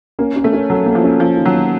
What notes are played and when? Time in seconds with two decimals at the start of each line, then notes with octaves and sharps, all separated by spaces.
0.19 A#3 C#4
0.36 C#4
0.44 A3
0.53 C#4
0.69 F#3 A4
0.86 A#3
0.95 F3
1.04 C#4
1.20 F3 A#3
1.37 D#3
1.45 F#3
1.54 A#3